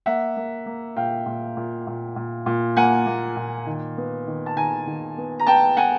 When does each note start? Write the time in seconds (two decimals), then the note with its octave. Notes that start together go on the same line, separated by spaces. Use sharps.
0.06 A#3 E5 F#5
0.37 A#3
0.66 A#3
0.96 A#2 F5 G5
1.26 A#2
1.57 A#2
1.87 A#2
2.16 A#2
2.46 A#2
2.76 A#3 F#5 G#5
3.06 A#3
3.36 A#2
3.67 D#3
3.97 B3
4.27 D#3
4.46 A5
4.56 D#3 G#5 A#5
4.87 D#3
5.18 B3
5.39 A#5
5.47 B3 G5 A5
5.77 B3 F#5 G#5